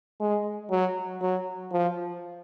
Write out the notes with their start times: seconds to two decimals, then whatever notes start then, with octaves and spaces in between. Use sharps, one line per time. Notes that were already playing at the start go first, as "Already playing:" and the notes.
0.21 G#3
0.71 F#3
1.22 F#3
1.72 F3